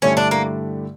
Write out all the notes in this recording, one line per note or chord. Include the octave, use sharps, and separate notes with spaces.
G2 D3 A3 C#4 E4 G4
D4
A#3